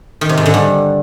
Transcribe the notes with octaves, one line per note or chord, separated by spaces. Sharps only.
D#3
C3
G#2
D3
G2